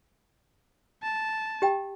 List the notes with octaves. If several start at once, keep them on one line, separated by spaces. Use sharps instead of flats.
A5
G4 G5